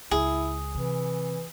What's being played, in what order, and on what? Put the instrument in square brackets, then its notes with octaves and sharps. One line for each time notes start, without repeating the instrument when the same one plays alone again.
[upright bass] C#2 [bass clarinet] E4 [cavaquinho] G#4
[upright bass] C3 [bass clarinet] E3